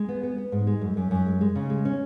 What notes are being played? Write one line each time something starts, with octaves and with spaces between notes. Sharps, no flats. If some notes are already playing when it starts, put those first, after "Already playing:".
Already playing: G#3
B3
B3
B3
G#2
G#3
F#2
F#2
F#2
G#3
G#3
C#3
G#3
C#4